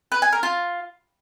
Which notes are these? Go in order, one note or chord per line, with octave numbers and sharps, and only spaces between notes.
B4
G#5
A#4
F4